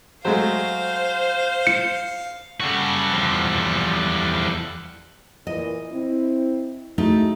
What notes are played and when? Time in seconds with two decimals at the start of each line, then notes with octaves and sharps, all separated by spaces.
0.25 F#3 G#3 A3 C5 F5
1.67 C#7
2.60 C#3 G3 F#4 A4 F#5
3.13 E2 F3
5.47 A#2 E3 D#5
5.93 C4 E4
6.98 G#3 A3 D#4 E4 F#4